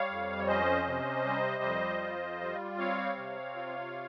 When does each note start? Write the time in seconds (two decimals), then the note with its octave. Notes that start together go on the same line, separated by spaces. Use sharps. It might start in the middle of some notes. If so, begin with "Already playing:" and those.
Already playing: G3 C#5 F5
0.10 F2
0.38 C#5
0.47 C#4 C5 D#5
0.87 C3
1.25 G3
1.63 F2
2.01 F4
2.41 G3
2.78 C4 C#5 F5
3.17 C3
3.56 F4